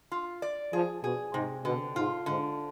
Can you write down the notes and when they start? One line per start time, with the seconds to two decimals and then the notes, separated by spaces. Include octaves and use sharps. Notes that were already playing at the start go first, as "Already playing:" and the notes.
0.11 F4
0.42 D5
0.73 F3 G#4
1.03 B2 G#4
1.34 G#2 C3
1.65 B2 D3
1.96 G#2 F4
2.26 G#2 D3